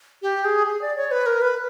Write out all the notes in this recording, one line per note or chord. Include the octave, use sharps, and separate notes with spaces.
G4
G#4
G#4
D5
C#5
B4
A#4
B4